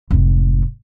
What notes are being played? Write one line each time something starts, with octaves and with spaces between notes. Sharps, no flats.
F1 G#2